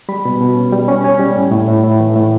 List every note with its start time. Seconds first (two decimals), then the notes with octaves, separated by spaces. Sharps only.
0.09 G3 B5
0.25 B2
0.41 B2
0.56 C#4
0.72 G3
0.88 C#4
1.04 C#4
1.20 G3
1.36 A2
1.51 A2
1.68 A2
1.84 A2
2.00 E3
2.16 A2